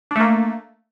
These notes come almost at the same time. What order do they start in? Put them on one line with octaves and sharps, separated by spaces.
D4 A3 A#3